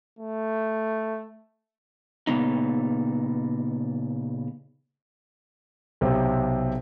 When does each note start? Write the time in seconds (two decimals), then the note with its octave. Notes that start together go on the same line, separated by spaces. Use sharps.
0.19 A3
2.27 A#2 C#3 B3 D#4
6.01 B1 C3 C4